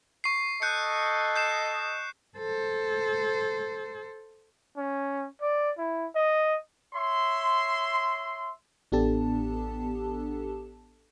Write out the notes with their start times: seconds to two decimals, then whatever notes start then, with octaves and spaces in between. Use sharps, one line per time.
0.24 C#6 C7
0.62 A4 D#5 F#6 G6 C#7
1.36 G6 C7 E7
2.37 A4 C5
4.77 C#4
5.41 D5
5.78 E4
6.15 D#5
6.95 C#5 E5 C6
8.92 A1 B3 D4 G4 A4 A5